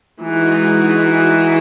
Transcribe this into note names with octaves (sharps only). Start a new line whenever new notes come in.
E3 G#3 D#4 F#4